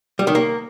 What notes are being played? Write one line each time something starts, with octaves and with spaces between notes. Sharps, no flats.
G3
D#3
A#3